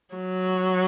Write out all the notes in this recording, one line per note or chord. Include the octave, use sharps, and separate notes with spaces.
F#3